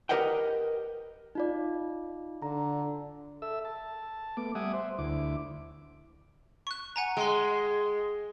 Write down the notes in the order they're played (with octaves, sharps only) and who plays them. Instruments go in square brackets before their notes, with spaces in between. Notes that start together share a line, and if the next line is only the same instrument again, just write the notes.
[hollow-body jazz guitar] G4 A#4 B4 D#5 F#5 G5
[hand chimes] D#4 F4 D5
[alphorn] D3 [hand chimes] A#5
[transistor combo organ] A4 E5 E6
A5
A3 B3 D6
G3 E5 F#5 G#5 D6 D#6
C5 E5
D2 E4 D6
[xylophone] C#6 F#6
F#5 G#5 A#5
[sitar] G#3 [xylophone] G5 C6